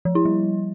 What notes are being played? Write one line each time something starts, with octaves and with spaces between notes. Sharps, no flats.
F3
E4
G3